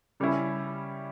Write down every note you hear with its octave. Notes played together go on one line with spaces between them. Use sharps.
C#3 G3 C#4 E4